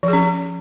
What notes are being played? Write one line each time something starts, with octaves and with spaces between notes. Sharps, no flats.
F3
G#4
C#4